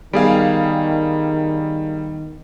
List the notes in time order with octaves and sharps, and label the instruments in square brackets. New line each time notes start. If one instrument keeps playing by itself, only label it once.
[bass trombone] D#3 [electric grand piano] G3 G#4 F5 [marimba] B3